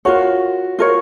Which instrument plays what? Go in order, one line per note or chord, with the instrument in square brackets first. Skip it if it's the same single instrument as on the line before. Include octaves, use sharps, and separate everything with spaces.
[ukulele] F4 A#4 C#5 [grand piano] F#4
[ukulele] F4 A#4 C#5